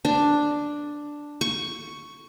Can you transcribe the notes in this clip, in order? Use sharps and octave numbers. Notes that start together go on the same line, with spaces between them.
D4
C#6